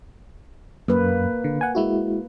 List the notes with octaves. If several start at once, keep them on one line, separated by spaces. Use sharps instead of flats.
F#2 A#3 B4
D3
F#5 G#5
G#3 E4 F#4